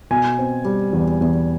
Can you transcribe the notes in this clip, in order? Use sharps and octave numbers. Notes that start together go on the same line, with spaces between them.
B2 G#5
C4
G3
E2
E2